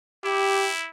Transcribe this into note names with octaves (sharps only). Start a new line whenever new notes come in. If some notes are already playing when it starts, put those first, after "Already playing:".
E4 G4